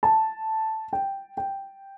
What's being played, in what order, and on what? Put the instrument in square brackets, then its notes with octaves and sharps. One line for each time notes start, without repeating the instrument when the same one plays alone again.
[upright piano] A5
G5
G5